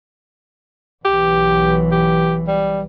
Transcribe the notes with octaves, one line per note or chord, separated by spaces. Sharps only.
B1 E3 G4
G4
G3